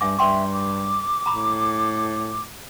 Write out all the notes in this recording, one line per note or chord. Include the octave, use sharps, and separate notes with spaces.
G2 E5 G#5 D6
G2 E5 G5 C6 C#6
D6
A2 A#5 B5